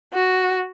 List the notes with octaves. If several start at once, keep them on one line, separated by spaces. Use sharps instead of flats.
F#4